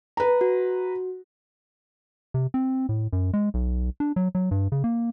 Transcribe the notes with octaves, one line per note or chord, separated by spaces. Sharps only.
B4 A#5
F#4
C3
C4
A2
F#2
G#3
B1
D4
F#3
F#3
G2
C#3
A#3